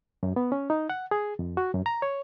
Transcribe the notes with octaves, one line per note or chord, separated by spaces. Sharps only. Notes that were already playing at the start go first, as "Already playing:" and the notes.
F#2
B3
C#4
D#4
F#5
G#4
F2
F#4
F#2
A#5
C#5